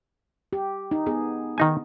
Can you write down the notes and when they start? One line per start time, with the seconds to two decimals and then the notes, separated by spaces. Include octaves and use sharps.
0.53 G4
0.91 D#4
1.06 B3 G#4
1.58 D#3 D#4 G#5